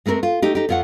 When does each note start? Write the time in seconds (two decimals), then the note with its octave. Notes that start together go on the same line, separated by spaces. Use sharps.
0.06 G#3 A3 C4 A4 A#4
0.23 F4
0.42 A3 D#4 G4
0.55 D#4 G4
0.69 F2 F3 F4 C#5 F#5